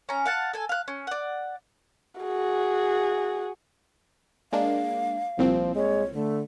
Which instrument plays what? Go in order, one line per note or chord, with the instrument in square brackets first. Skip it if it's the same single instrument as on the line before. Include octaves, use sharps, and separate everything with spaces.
[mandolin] C#4 A#5
F5 F#5 A5
A4 G#5
F5 F#6
C#4
D5 F#5
[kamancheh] F#4 G#4
[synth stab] G#3 A#3 D4 [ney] F5
[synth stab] C2 A#2 C4 [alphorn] F3
[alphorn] G#3 [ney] C#5
[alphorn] D3 [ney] A3